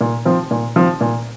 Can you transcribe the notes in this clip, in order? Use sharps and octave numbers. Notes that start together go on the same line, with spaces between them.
A#2
F3 C4
A#2
F3 C4
A#2